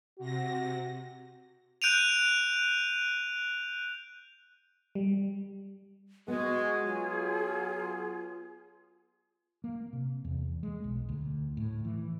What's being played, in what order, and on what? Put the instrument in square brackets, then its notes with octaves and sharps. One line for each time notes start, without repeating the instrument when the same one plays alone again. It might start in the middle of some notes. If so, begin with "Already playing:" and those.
[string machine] C3 A#6 [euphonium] F#4
[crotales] F#6 G6 D7 D#7 F7
[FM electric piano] G3
[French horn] G#3 [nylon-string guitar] B3 [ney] F#4 [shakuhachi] G#4
[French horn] F#3 [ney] F4
[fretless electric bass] A#3
C3
E2
G#3
B1
D2
A2
E3